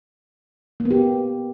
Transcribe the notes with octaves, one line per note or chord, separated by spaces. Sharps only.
A#3
B3
G4